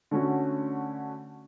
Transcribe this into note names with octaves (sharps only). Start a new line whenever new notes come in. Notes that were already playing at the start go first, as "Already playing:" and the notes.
D3 A3 C#4 F#4